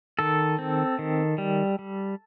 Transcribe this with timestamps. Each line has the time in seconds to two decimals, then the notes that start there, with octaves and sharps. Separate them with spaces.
0.19 D#3 A4
0.59 C4
0.99 D#3
1.38 G3
1.79 G3